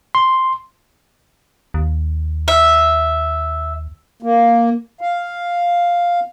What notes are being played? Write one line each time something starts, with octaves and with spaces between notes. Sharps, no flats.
C6
D#2
E5
A#3
F5